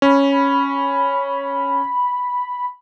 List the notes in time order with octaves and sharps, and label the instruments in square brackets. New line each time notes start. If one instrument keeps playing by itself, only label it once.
[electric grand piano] C#4 [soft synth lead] B5